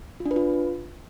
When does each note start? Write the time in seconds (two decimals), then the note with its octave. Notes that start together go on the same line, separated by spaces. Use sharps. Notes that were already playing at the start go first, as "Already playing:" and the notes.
0.20 F4
0.26 D4
0.31 B4
0.36 F4